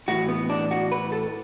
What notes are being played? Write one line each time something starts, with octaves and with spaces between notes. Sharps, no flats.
A2 E3 F#4
B3
D4
F#4
B4
A4